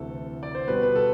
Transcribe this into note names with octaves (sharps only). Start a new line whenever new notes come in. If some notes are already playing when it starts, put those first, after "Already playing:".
Already playing: D2 C3 E3 A3 A4
D5
C5
B2 G3 B3 B4
B4
A4